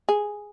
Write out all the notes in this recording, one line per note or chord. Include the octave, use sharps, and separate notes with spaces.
G#4